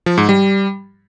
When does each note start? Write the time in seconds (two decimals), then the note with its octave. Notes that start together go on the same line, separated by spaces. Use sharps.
0.06 F3
0.18 G#2
0.29 G3